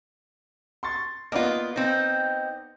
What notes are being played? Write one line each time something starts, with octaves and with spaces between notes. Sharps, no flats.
C6 C#6 A6
A#3 B3 F4 D5 D#5
C4 D#4